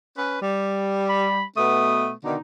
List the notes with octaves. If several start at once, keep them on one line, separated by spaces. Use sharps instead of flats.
C#4 B4
G3
B5
B2 A3 B3 D#6
B2 D3 D#3 D#4